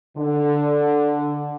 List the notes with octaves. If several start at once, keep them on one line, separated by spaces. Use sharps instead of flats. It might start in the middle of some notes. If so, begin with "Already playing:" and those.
D3